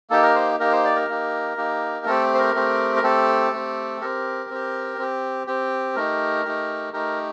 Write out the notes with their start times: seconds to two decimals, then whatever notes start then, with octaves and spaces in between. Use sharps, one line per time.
0.10 A#3 D#4 G4 A4
0.23 A#4
0.35 C5
0.59 A#3 D#4 G4 A#4
0.72 C5
0.84 D5
0.96 A#4
1.08 A#3 D#4 G4
1.57 A#3 D#4 G4
2.06 A3 C4 G4 A4
2.34 C5
2.38 A#4
2.54 A3 C4 G4
2.96 A#4
3.03 A3 C4 G4 A4
3.53 A3 C4 G4
4.01 C4 G4 A#4
4.50 C4 G4
4.98 C4 G4
5.47 C4 G4
5.96 A3 D#4 G4 A#4
6.45 A3 D#4 G4
6.93 A3 D#4 G4 A#4